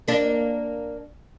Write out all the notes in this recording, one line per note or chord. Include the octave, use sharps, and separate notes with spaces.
A#3 D4